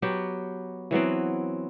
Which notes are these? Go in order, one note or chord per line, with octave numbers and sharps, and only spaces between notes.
F#3 B3 G4
E3 F#3 B3 C4